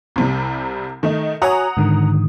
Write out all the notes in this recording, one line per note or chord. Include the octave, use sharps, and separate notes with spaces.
C2 C3 G3
D#3 A3 D#4
F#4 C#5 F#5 G#5 A#5 D#6
G#2 D3 D#3